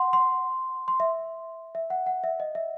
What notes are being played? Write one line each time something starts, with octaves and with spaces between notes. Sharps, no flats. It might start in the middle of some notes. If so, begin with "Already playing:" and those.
Already playing: F#5 C6
C6
C6
E5
E5
F#5
F#5
E5
D#5
E5